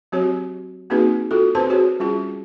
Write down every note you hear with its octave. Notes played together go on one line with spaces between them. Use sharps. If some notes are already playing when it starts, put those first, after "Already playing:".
F#3 C4 F#4 G4 C#5
A#3 C4 D#4 F#4 G#4 B4
F4 F#4 A4
C4 G4 B4 C5 A5 C6
F#4 G#4 B4 C#5
G3 C#4 F4 G#4